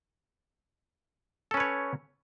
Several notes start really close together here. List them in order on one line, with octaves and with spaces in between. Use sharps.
A4 C#4 B4 C#5